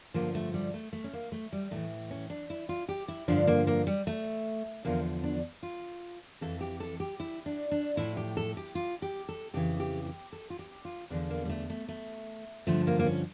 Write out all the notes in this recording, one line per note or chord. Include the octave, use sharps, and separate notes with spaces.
G2 D3 F3 A#3
A3
G3
A3
A3
C#4
A#3
A3
G3
A2 E3 A3
C#4
D4
E4
F4
G4
E4
G2 D3 F3 D4
A#3
A#3
G3
A3
E2 D3 F3 A#3
D4
F4
F2 E3 A4
G4
A4
G4
E4
D4
D4
A2 F3 E4
G4
A4
G4
F4
G4
A4
F2 C#3 E3 G4
G4
G4
A4
F4
G4
F4
E2 D3 F3 D4
A#3
G3
A3
A3
A3
G2 D3 F3 A3
A#3
A#3
C#4